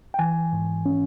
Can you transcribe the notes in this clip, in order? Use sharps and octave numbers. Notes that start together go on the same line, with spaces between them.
G5
E3 G#5
G#2
C#4